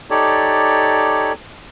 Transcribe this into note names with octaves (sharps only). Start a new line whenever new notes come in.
D#4 G4 A4 C#5 D5